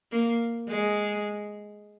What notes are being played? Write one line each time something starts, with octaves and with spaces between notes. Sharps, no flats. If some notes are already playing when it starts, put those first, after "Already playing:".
A#3
G#3